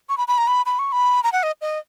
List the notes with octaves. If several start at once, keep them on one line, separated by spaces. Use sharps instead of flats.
C#6
B5
B5
A#5
B5
B5
C#6
B5
A#5
F#5
D#5
D#5